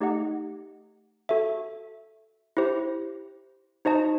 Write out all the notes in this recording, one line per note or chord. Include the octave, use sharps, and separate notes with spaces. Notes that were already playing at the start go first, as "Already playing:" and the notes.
A3 D#4 G4 D#5 F#5
F#4 A4 E5
E4 G4 C5
D#4 F#4 C5 D#5 A5